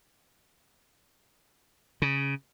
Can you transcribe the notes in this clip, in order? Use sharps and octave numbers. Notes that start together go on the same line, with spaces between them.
C#3